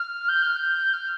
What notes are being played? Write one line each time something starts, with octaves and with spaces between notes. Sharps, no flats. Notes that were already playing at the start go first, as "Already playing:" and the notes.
Already playing: F6
G6
F6
G6
F6